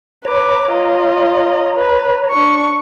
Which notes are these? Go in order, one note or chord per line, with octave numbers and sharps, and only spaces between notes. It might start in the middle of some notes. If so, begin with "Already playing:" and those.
B4 C#5 A#5 D6
F4 D#5
B4
D4 C#6